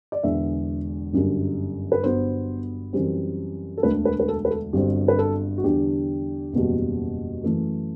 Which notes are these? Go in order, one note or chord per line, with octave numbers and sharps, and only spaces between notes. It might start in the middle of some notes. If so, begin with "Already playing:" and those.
D5
E1 E2 D3 E5
G1 F#2 D3 G3
B4
G1 G2 F#3 B3 C5
F#2 E3 G3 C4
A4
E1 D2 D3 A3 B4
B4
B4
A4
B4
A4
G1 G2 F#3 C4 G4
B4
A4
F#4
E2 D3 G3 D4 G4
F#1 E2 B2 G3
F#2 E3 A3